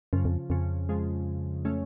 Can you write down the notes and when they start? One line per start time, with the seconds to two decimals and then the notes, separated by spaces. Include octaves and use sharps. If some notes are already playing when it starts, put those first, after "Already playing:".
0.13 F#2 C#3 F3
0.25 F2
0.50 F2 C#3 F3
0.89 F3 G#3
1.65 A3 C#4